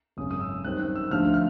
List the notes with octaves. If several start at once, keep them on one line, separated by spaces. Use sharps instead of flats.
G#1 F#2 C#3 D#6
D#6
E6
F#2 D#3 G3 C4 F#6
F#6
E6
D2 D3 F3 A3 F6
F6